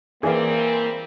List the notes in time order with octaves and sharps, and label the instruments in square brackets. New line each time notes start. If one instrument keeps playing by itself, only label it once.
[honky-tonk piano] E3 [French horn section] G3 C4 [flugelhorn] A#3 [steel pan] G#4 D5 F5